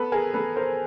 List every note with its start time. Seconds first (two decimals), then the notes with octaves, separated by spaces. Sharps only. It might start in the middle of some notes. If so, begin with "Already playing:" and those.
Already playing: B3 A4 B4
0.12 G#4 A#4
0.34 B3 A4 B4
0.56 A#4 C5